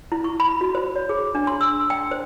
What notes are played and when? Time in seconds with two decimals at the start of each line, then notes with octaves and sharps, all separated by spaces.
0.12 E4
0.24 C#6
0.40 B5
0.61 F#4
0.75 C5
0.96 C#5
1.09 G#4
1.35 D4
1.47 C6
1.61 E6
1.90 G5
2.11 C5